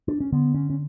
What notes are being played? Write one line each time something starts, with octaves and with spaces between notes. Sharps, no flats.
D4
C#4
D3 B3
C#4
C#4